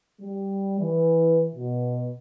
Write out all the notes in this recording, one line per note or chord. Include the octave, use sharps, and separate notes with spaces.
G3
E3
B2